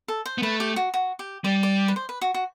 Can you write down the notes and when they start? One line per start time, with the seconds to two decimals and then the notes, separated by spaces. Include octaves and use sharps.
0.08 A4
0.26 C5
0.38 B3
0.42 A3 B4
0.60 G4
0.76 F#4
0.94 F#4
1.19 G4
1.44 G3 D5
1.63 D5
1.88 B4
1.96 C5
2.09 B4
2.21 F#4
2.34 F#4